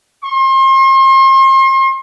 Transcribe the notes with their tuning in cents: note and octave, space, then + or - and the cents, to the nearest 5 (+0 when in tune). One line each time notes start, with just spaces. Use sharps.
C6 +40